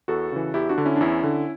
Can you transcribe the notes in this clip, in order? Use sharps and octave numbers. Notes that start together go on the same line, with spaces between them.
E2 F#4 A4
C#3 E3
E2 E4 G4
D4 F#4
D3
C#4 E4
D4
E2 C#4 E4
D3